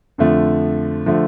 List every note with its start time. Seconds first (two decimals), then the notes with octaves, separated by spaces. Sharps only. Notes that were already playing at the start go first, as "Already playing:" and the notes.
0.18 F2 D3 F3 A3
1.06 D3 F3 A3